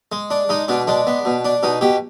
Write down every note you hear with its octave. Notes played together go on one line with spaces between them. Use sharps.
G#3
D4
G#3 D#4
B2 D4
G#3 D4
B3
B2
D4
B2 D#4
B2 G4